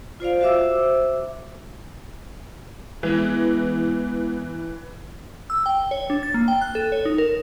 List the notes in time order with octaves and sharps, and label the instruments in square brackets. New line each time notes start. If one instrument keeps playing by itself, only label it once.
[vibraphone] F4 C5 D5 F5
F#4 C5 E5 D6 E6
[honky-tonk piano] E3 [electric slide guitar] G#3 B3
[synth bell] E6
G5
C#5
D4
A6
A#3
G5
F#6
A4
C#5
D#4
A#4